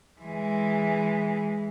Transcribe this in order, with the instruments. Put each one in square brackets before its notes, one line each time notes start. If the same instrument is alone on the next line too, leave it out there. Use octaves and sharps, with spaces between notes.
[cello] E3 G#3